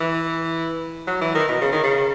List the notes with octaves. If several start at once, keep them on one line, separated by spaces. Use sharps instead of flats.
E3
F#3
E3
D#3
B2
C#3
D#3
C#3